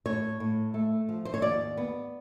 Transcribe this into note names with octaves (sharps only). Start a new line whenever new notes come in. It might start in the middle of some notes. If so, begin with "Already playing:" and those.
A2 C#5
A2
A3
F3
C5
C#5
D#2 D5
B3